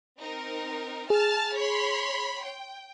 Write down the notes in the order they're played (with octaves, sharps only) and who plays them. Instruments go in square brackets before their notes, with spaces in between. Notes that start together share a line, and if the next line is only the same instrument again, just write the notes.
[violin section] C4 D#4 A#4
[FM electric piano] G#4 [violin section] A5 F6 A6
[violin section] C#5 B5 C6
G5